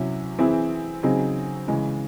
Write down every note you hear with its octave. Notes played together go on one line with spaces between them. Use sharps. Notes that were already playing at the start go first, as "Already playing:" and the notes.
Already playing: C3 F#3 C#4 E4
E3 C4 E4 G#4
C#3 F#3 C4 D#4 G#4
C#3 E3 G#3